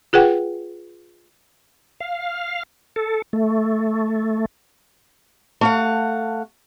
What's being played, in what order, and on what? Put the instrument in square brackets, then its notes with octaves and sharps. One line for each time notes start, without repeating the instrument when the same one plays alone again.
[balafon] F4 G#4 B4 F#5 G5
[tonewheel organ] F5
A4
A3
[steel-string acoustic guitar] A3 F5 F#5